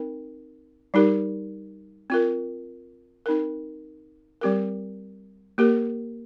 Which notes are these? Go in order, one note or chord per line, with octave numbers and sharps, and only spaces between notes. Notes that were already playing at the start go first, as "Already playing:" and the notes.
Already playing: C4 D#4 A#4
G3 D#4 G4 A#4
C4 F4 A#4
C4 D#4 A#4
G3 C4 G4 A#4
A#3 G4 A#4